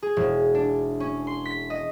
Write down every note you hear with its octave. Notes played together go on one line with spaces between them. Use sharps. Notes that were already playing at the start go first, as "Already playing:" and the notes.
G#4
E1
D4
C#4
C6
B6
D#5